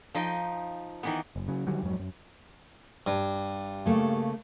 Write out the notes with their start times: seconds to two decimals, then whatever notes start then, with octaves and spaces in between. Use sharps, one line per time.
0.15 F3 D#4 D#5 G5
1.03 D#3 E3 B3
1.36 F#1
1.48 C#3 F#3
1.67 D3 D#3 F#3 G3
1.83 F2 G#2 F#3
1.99 F#2
3.07 G2
3.86 C#3 A3 A#3